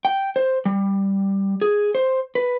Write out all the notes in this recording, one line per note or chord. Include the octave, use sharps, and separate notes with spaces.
G5
C5
G3
G#4
C5
B4